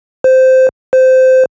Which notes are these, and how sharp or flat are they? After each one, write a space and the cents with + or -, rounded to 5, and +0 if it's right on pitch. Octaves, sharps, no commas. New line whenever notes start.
C5 -10
C5 -15